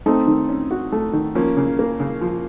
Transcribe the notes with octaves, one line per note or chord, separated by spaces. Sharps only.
A3 C4 D#4
D#3
C#4
F#4
A3
D#3
F3 A#3 C#4
C#3
A#3
C#3
F3